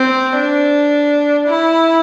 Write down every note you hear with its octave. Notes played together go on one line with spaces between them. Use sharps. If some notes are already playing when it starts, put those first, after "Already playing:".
Already playing: C4
D4
E4